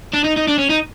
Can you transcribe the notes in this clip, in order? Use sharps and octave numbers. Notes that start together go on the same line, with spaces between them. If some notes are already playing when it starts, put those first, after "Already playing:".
D4
D#4
D#4
D4
C#4
D#4